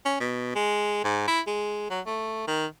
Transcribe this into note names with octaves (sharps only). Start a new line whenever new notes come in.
C#4
B2
G#3
G#2
E4
G#3
F#3
A3
D#3